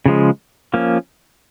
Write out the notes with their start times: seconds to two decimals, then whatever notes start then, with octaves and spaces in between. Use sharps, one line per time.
0.06 C#3 F3 G#3
0.74 F3 A#3 C#4